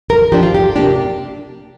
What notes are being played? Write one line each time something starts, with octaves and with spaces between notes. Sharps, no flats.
F2 A#4
F3 D4 G4
F4
F2 G4
C3 A#3 D4 G4